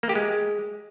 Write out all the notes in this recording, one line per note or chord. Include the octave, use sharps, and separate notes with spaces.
A#3
G4
G#3